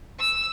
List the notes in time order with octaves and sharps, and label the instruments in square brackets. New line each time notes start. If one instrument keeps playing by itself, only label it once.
[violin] E6